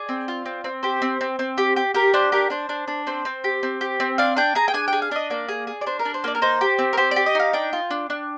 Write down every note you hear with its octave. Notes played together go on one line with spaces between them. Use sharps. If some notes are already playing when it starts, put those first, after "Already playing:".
Already playing: G#4 D5
C4
F4
C4
C4
G4 C5
C4
C4
C4
G4
G4
G4 A#4
D4 C5
G4 A#4
D4 C5
D4
D4
C4 C5
C4
G4
C4
G4
C4
D4 F5
D4 G5
G#4 A#5
G5
D4 G#5
G#4 G5
F5
D4 D#5
A#3 D5
G#4
G#4
D5
D4 C5
A#4
D4
C5
A#3 D5
A#4
D#4 C5
G4
C4
A#4
G4 C5
G4 D5
D#5
D#4 F5
D4 G5
F4
D4
D4